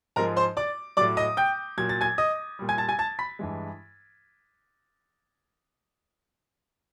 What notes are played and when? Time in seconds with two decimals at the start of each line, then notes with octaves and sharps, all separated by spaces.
0.16 G#2 F3 G#3 A#4 A#5
0.37 C5 C6
0.57 D5 D6
0.97 F#3 D5 D6
1.01 A2
1.17 D#5 D#6
1.37 G5 G6
1.77 A#2 F#3 G#6
1.89 A6
2.01 G#5 G#6
2.18 D#5 D#6
2.59 A#2 G3
2.69 G#5 G#6
2.78 A5 A6
2.89 G#5 G#6
2.99 A5 A6
3.19 B5 B6
3.39 G2 E3 G#3